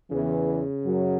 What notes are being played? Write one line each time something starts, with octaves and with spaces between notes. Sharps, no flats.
E2 C#3 E3
F#2 F#3